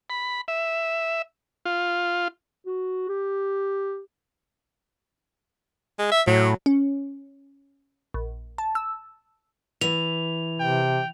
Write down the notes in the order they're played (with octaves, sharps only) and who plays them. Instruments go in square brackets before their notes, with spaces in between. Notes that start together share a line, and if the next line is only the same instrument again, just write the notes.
[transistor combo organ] B5
E5
F4
[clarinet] F#4
G4
[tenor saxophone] G#3
E5
[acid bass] A2 [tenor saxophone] F#3
[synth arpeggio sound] C#4
A#1
A5
E6
[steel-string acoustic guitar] E3 [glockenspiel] F7
[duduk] C3 [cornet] G5